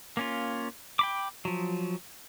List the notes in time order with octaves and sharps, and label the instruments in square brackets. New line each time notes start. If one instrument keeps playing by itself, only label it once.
[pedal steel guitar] A#3 C#4 F4
G5 B5 D6
F3 F#3